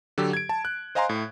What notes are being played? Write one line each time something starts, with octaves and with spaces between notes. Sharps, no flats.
D3 F#3 G4 A4
G#6 D7
A5
F#6
C5 D#5 F5 G#5 A#5 C6
A2